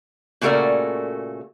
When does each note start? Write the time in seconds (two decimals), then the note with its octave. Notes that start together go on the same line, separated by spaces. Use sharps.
0.41 A#2 C#3 A3 F#4 A#4 D5